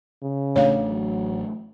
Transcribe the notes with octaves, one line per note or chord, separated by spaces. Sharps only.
C#3
A1 A3 D4 C#5 F5
F#3